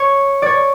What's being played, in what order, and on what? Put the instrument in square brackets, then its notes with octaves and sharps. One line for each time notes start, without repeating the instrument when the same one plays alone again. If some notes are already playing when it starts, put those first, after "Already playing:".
Already playing: [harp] C#5
C#5 D5